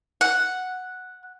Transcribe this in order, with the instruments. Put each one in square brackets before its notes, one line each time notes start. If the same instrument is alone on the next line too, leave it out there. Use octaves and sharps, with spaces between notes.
[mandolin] F#5